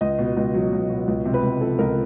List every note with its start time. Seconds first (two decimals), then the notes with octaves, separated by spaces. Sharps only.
0.01 C#2 D#5
0.19 B2
0.37 C#2
0.54 F#3
0.72 C#2
0.90 B2
1.07 C#2
1.25 C3
1.34 B4
1.43 C#2
1.61 F3 A4
1.78 C#2 A#4